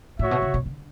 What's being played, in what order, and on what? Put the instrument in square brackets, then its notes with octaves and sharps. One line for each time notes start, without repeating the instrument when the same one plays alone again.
[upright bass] A2 [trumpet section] F#4 C#5 E5
[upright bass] B2
C#3
B2
D3